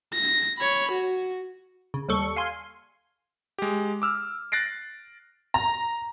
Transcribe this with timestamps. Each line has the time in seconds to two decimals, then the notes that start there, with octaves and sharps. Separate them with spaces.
0.13 A#6
0.58 C#5 B5
0.91 F#4
1.94 C#3
2.09 D#2 G3 A4 C#6
2.36 F5 G#5 C6
3.58 G#3 G4
4.02 D6 E6 F6
4.52 F#6 A6 A#6 C7 D7
5.54 A#5